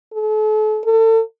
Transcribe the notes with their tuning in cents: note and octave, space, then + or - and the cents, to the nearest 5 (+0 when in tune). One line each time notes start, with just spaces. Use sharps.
A4 -40
A4 +35